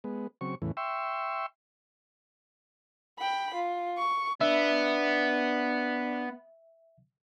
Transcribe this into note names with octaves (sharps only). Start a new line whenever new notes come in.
G#3 B3
C#3 F#3 C4 C#6
E2 A2 C#3 E3
E5 G5 C6 C#6 E6
G5 B5
F4
C#6
B3 D4 E5